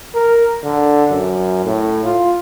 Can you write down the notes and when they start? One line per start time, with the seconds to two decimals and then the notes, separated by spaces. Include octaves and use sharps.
0.15 A#4
0.64 D3
1.11 F#2
1.65 A2
2.05 F4